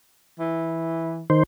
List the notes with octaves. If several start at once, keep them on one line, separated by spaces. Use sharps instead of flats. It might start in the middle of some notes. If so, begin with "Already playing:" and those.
E3
D#3 C5